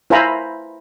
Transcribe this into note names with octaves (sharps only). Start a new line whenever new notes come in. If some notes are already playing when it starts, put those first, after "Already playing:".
E4 C5 F5 G#5 A#5 B5